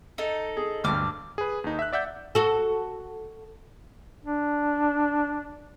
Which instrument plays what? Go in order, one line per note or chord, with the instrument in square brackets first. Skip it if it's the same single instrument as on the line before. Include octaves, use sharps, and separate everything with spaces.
[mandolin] D#4 A4
[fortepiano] G#4
[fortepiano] D2 G2 [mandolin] D6 F6
[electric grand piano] G#4 B4
D#2 D#4
E5 F#6
D5 E5 F#5 G6
[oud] F#4 A4
[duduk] D4